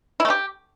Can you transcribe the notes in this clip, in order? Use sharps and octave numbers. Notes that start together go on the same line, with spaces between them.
E4
A3
G4